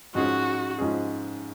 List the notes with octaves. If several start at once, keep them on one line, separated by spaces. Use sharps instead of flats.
G#2 F3 G#3 C#4 F#4 G#4
G#2 F3 G#3 C#4 G#4